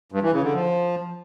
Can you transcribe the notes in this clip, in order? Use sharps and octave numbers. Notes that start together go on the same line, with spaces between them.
G2
E3
C#3
D3
F3